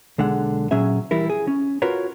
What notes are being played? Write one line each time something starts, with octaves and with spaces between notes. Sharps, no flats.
B1 D3 G#3 F#5
A#2 F#3 C#4 G#4 E5
E3 G3 E4 A#4
G#4
C#4
F4 F#4 A#4 B4 C#5